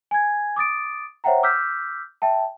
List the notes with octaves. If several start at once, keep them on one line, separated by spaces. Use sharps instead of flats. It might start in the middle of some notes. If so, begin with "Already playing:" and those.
G#5 G#6
D6 D#6 A6 D7
C5 C#5 E5 F#5 G5 A#5
D6 E6 F6 G6 B6
E5 G5 A5